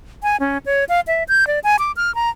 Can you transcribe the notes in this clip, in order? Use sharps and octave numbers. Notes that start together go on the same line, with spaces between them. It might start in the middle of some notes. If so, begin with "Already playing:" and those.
G#5
C#4
C#5
F5
E5
G6
D5
G#5
D6
F6
A#5